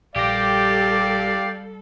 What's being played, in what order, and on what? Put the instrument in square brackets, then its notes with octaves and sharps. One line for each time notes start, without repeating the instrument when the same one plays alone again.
[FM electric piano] A#1 A#6 [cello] G3 A4 [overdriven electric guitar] G4 [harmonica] D5 F5